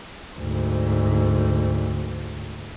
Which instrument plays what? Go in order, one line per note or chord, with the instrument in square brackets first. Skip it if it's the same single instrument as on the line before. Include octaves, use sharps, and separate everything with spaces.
[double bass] D2 G#2